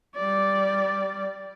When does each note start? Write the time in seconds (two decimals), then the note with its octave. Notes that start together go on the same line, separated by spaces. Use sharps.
0.16 G3 D5